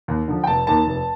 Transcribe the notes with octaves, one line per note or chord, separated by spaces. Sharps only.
D#2
D3 F3
G5
F1 A5
D#2 D#3 A5
F1